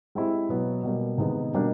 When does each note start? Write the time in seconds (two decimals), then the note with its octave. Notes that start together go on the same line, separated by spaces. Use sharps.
0.15 G#3 C4 E4 G4
0.49 B2 F#3 B3
0.83 B2 G3 A#3
1.18 C3 D#3 G#3 B3 D#4
1.53 B2 G3 A#3 D4